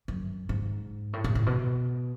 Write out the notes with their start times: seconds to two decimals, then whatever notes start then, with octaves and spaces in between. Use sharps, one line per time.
0.08 F#2
0.49 G#2
1.13 A2
1.24 A2
1.35 A2
1.46 B2